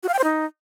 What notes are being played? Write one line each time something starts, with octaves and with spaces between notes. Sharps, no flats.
F#4
F5
G5
C5
D#4